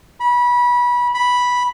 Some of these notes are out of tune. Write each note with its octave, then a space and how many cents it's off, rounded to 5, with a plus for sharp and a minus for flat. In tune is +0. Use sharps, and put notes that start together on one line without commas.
B5 -25
B5 -5